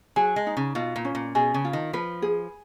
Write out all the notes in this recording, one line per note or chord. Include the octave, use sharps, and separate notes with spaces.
F#3 G#4
G#3
D#4
C#3
B2 F4
A#2
C#4
A#2
B2 G#4
C#3
F4
D#3
F3 B4
G#4